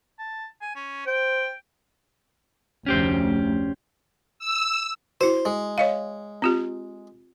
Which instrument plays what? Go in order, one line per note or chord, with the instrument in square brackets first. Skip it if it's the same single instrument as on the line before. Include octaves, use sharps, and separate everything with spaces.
[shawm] A5
G#5
C#4
[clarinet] C5 [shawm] G5
[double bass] F1 D2 [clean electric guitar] C#4 G4 C5
[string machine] E6
[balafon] E4 F#4 [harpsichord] C5
[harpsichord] G#3
[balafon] C#5 D#5 F5
C4 F4 G4